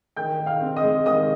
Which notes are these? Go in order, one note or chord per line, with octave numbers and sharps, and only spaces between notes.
D#3 G5 G6
D#3
F5 F6
C4
D#5 D#6
G#3
D#3 D#5 D#6